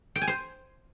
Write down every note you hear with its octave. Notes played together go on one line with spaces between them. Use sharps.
G5
G#5
C5